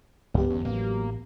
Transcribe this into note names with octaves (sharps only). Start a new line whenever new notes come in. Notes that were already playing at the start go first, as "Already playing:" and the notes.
C#2 G2 B3 G4
G1 E2 C#4
A1 F#3 A#3